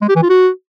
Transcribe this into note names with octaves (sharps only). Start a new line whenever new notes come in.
G#3
G4
E3
F4
F#4